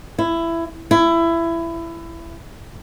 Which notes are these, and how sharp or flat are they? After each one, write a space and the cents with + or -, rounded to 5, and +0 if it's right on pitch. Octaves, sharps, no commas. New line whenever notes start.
E4 +15
E4 +20